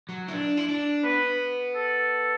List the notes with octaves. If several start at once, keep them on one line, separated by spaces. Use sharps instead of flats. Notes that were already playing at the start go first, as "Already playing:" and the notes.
F#3
E4
D4
E4
D4
B3 B4
A4